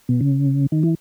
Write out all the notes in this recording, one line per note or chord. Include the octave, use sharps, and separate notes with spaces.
B2
C#3
D#3
E3